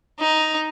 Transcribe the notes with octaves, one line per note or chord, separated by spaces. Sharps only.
D#4